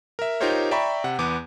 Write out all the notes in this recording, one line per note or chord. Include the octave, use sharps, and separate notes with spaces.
A#4 E5
D#4 F4 G4 A#4 C5 C#5
D5 E5 G5 A#5 B5 C#6
C3 F#5
E2 B3 D6